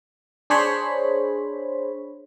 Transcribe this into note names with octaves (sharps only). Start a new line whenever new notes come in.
D4 G#4 C5 C#5 B5